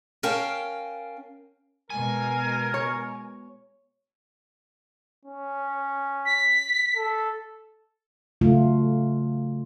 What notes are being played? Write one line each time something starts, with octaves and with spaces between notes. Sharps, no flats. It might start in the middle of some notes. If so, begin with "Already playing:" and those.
C#4 A#4 F5 G5 A5
B2 G#3 A#4 G#5
C#5
C#4
B6
A4
C#3 F#3 A3 F4